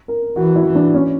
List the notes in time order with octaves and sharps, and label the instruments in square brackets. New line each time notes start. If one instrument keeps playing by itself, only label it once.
[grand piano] A#4
[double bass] E3 [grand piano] F#4
[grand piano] E4
[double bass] E3
[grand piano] D4
C#4